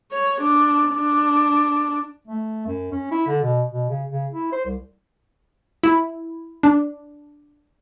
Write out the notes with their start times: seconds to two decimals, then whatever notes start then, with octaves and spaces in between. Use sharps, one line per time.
0.12 C#5
0.41 D4
0.94 D4
2.28 A3
2.67 F#2
2.92 C#4
3.11 E4
3.27 D3
3.42 B2
3.71 B2
3.89 C#3
4.11 C#3
4.32 E4
4.52 C5
4.66 C2
5.83 E4
6.63 D4